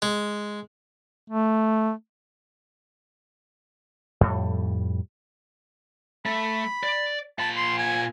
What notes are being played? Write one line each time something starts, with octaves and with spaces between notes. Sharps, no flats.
G#3
A3
F2 A2 G3
A3 B5
D5
A#2 A5 B5
C6
G#5